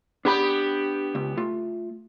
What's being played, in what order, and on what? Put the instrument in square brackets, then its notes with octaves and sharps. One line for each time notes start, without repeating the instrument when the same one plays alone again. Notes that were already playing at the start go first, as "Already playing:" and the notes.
[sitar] B3 G4 [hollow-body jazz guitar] D4 G#4 B5
[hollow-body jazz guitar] C#2
A3 F4